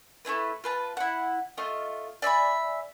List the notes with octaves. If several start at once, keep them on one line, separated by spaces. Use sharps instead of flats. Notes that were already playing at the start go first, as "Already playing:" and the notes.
A3 D4 E4 B4
F4 B4 A5
E4 F#5
A3 F4 D#5
D5 E5 G#5 B5